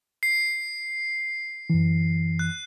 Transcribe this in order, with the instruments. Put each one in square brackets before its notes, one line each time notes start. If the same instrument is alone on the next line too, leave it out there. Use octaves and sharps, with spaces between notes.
[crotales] C7
[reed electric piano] F#2 E3
[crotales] F#6